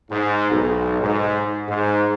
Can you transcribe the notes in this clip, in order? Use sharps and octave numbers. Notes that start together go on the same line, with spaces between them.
G#2
B1
G#2
G#2